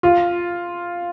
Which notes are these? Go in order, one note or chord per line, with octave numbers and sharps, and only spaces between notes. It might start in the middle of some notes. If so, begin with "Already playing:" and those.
F4